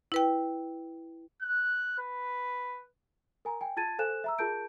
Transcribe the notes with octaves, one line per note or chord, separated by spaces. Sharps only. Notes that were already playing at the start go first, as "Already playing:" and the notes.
E4 B4 G5
F#6
B4
A#4 G#5 A#5
G5 G#5
F4 A5 G#6 A6 D#7
A4 C5 F5 G#5 F#6 E7
E5 A#5 E6
F4 G#4 A#4 A5 G6 D7